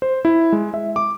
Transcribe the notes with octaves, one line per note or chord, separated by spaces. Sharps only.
C5
E4
G#3
E5
D6